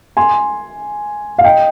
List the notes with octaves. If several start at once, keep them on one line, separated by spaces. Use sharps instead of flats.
G#5 C6
F5
D#5 G5